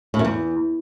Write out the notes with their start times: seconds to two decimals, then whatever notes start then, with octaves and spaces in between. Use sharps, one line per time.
0.14 A2
0.19 F#2
0.25 E2